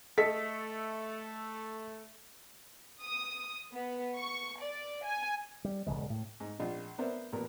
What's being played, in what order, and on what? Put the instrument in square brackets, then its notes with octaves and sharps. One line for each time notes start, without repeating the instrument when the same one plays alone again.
[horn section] A3 [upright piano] A4 [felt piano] D#5 B6
[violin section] D#6
B3
C#6
D5
G#5
[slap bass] G3
D#1 E2 C#3 G#3
A2
[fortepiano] G#2
A#1 F4 D5 D#5
B3 A#4 C5 D5 E5
A1 A#2 B3 A#4